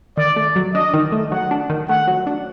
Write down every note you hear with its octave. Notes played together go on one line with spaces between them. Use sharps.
D#3 D5
A3
F#3
D4 D#5
D#3
A3
F#3 F#5
D4
D#3
A3 F#5
F#3
D4